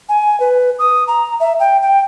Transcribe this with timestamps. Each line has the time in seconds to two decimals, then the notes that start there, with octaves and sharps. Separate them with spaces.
0.09 G#5
0.40 B4
0.79 D#6
1.07 A#5
1.40 E5
1.60 G5
1.82 G5